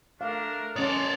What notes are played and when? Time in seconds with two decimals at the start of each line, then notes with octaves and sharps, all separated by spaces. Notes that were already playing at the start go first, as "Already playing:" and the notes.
0.21 A3 D4 A#4 F5
0.76 C#4 C#5 D5 A5 C6 D6 D#6